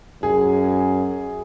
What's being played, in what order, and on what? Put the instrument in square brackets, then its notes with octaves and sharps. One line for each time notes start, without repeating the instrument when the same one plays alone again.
[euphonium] F#2 [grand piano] G#4